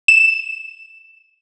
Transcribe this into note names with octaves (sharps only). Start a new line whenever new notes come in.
E7